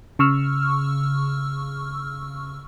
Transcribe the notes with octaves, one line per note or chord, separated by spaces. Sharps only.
C#3 C#6 E6 F6